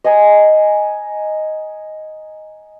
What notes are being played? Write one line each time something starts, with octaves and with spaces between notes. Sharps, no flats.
D#5 F#5 G#5 A#5